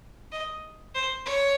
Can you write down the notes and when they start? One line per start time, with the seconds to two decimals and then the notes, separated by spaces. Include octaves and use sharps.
0.32 D#5
0.95 C5
1.26 C#5